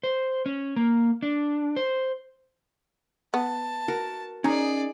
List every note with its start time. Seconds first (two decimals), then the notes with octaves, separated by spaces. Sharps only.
0.03 C5
0.46 C#4
0.76 A#3
1.22 D4
1.76 C5
3.34 B3 A5
3.88 F#4 A#4
4.44 C#4 D#4 G#4 D5 A#5